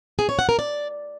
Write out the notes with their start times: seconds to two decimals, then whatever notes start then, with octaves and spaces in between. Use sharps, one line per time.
0.19 G#4
0.29 C#5
0.39 F#5
0.49 A#4
0.59 D5